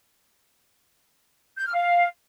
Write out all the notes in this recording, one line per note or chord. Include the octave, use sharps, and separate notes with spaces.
G6
F6
F5